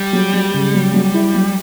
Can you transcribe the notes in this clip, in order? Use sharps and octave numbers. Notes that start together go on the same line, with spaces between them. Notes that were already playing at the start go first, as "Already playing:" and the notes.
Already playing: G3
F#3
F#3
C#3
F#3
F#3
E4
F#3